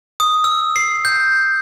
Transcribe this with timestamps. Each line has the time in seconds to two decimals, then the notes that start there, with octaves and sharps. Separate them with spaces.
0.20 D#6
0.44 E6
0.76 C7
1.05 G6